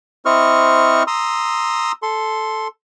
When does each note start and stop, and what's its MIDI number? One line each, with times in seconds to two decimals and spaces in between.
0.26 1.03 60
0.26 1.03 64
0.26 1.03 72
0.26 1.03 75
0.26 1.03 85
0.26 1.03 89
1.07 1.92 82
1.07 1.92 84
1.07 1.92 87
1.07 1.92 88
2.03 2.68 69
2.03 2.68 84